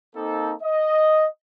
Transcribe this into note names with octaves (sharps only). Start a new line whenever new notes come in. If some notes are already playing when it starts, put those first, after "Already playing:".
A#3 C4 D#4 A4
D#5